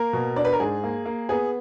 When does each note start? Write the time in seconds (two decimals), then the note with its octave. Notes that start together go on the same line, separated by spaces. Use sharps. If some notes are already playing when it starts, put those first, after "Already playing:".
Already playing: A#3 A#4
0.13 B2
0.36 D4 D5
0.45 B4
0.53 A#4
0.60 G#2 G#4
0.84 A#3
1.06 A#3
1.29 B3 G#4